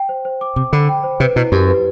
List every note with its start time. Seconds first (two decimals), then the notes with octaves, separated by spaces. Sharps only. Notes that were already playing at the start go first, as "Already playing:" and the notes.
Already playing: G5
0.09 C5
0.25 C5
0.41 D6
0.56 C3 D6
0.73 D3 B5
0.89 G5
1.04 C5
1.20 C3 B4
1.36 B2 E4
1.52 F#2 G4
1.68 B4